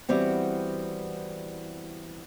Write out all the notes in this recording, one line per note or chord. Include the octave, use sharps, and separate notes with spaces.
E3 G3 B3 C4 F#4